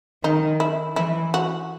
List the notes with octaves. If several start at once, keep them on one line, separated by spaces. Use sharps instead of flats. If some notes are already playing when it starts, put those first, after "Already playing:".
D#3 D#4
E4
E3 E4
F#4